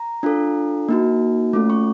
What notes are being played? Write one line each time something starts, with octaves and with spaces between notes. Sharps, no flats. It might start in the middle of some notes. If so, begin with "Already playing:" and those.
Already playing: A#5
D4 F4 A4
A#3 D#4 F#4
A3 C#4 F4 A4
C#6